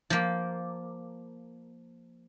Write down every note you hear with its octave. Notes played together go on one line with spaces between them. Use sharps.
F3 A#3